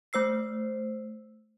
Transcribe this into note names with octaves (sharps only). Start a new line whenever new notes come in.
A3 C5 E6 C7